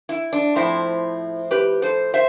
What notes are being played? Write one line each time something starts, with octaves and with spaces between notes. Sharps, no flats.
E4
D4
A2 F3 C4 E4
G4 B4
A4 C5
C5 E5